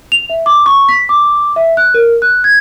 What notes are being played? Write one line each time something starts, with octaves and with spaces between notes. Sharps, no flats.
F7
E5
D6
C#6
B6
D6
E5
F#6
A#4
F#6
G#6